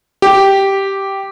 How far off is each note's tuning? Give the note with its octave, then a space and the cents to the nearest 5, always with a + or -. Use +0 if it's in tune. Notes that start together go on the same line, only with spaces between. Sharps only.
G4 -5